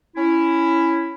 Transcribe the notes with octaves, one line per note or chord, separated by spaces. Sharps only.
C#4 E4